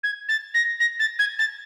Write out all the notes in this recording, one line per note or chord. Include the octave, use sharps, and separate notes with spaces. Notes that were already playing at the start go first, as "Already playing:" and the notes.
G#6
A6
A#6
A#6
A6
G#6
A6